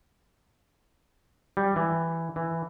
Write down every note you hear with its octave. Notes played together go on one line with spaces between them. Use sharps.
G3
E3
E3